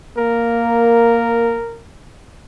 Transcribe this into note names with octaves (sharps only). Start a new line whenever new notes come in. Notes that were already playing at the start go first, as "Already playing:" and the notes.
A#3 A#4